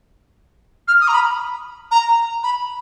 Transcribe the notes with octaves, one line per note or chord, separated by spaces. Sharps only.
F6
D#6
A#5
B5
A#5
B5